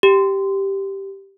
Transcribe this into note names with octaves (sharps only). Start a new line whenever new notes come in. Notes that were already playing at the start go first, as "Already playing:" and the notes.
G4